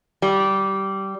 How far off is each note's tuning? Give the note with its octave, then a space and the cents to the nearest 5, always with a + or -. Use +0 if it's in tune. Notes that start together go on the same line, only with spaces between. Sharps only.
G3 -15